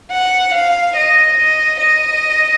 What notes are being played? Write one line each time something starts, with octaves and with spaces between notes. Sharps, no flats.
F#5
F5
D#5
D#5
D#5